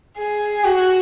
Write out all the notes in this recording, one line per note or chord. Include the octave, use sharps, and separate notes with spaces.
G#4
F#4